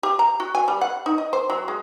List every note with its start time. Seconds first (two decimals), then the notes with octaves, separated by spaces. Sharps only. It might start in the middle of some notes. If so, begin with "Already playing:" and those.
0.03 G4
0.19 A#5
0.40 F#4
0.55 G#5
0.68 G3
0.81 F#5
1.06 D#4
1.18 D#5
1.33 C5
1.50 F#3
1.68 G#3